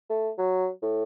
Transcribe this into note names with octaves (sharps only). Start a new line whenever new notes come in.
A3
F#3
A2